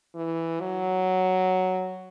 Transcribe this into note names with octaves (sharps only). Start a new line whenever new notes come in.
E3
F#3